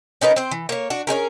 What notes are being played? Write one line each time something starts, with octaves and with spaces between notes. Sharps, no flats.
C#4 D#4 A#4 B4
C4 C5
E3
A#3 C#5
D4 F#4
C#4 D#4 G#4 A#4